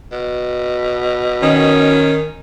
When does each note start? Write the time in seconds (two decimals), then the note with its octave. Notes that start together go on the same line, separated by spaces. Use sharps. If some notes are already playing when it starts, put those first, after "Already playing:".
0.12 B2
1.42 D#3 C#4